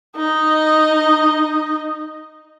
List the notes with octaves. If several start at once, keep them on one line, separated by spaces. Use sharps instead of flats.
D#4 D#5